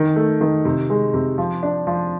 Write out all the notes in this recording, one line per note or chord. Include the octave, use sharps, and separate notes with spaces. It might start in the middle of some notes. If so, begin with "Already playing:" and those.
Already playing: D#3
A3
D#3
C3
G#3
C3
F3
D4
F3